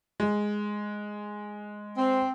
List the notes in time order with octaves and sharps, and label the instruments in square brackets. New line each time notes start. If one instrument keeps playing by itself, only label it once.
[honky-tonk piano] G#3
[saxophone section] C4